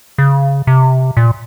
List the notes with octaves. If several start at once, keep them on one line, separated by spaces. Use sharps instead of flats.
C#3
C3
A#2